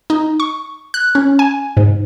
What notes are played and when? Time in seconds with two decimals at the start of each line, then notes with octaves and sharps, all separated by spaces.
0.10 D#4
0.40 C#6
0.94 F#6
1.15 C#4
1.39 G#5
1.77 G#2